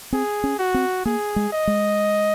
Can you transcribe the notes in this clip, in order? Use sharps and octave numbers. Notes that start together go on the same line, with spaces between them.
C4 G#4
C#4
F#4
C4
A#3 G#4
G#3
D#5
G#3